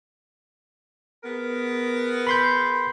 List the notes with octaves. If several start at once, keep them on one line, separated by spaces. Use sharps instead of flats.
B3 G#4 A#4
B5 C6 G6